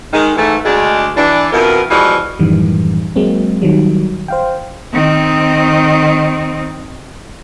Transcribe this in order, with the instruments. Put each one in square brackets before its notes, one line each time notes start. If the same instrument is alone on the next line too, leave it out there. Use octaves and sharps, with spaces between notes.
[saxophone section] D#3 G#3
G#2 E3 A3
D2 G#3 D4
E3 D4
F2 B2 E3 B3 A#4
B2 E3 F3 G3 G#3 F#4
[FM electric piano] F#2 A2 D#3 E3 G3
F#3 G#3 A#3 C4
D#3 F#3 G3
C5 F5 G5
[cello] D#3 C4